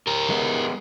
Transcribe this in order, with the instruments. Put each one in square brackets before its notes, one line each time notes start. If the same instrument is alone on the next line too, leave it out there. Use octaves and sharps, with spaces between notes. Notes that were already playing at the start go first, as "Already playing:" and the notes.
[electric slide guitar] G4 A#4
[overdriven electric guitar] G#3 B3